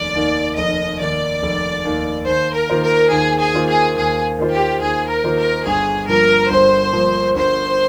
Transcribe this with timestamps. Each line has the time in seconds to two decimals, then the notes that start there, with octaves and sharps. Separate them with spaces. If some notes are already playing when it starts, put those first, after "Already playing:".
Already playing: F1 D#2 D5
0.15 D#2 D#3
0.58 F1 D#5
1.00 D#2 D#3 D5
1.43 F1
1.85 D#2 D#3
2.27 D#2 C5
2.55 A#4
2.70 D#3 A#3 F4 C5
2.84 A#4
3.11 D#2 G#4
3.39 G#4
3.54 D#3 A#3 F4 C5
3.68 G#4
3.96 D#2 G#4
4.38 D#3 A#3 F4 C5
4.53 G4
4.81 D#2 G#4
5.09 A#4
5.24 D#3 A#3 F4 C5
5.37 A#4
5.66 G1 G#4
6.08 G2 F3 A#3 A#4
6.50 G1 C5
6.93 G2 F3 A#3
7.36 G1 C5